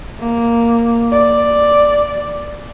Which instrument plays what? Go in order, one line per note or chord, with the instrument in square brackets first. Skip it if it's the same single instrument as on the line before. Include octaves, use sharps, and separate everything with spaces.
[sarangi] A#3
D5